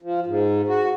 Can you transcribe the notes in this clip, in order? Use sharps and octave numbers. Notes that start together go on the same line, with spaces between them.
F3
G#2
F#4